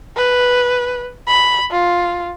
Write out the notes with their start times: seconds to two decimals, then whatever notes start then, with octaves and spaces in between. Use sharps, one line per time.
0.17 B4
1.28 B5
1.71 F4